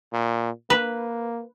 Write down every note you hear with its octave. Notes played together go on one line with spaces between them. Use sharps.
A#2
A#3 B4